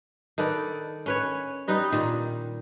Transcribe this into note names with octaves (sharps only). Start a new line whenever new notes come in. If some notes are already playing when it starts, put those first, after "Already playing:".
D#3 A4 B4 D5
C#4 B4 C#5
G3 D#4 B4 D#5
A#2 D#3